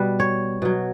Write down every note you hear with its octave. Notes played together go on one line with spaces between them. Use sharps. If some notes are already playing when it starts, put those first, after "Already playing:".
Already playing: B2 G3 B4
C#5
B2 F#3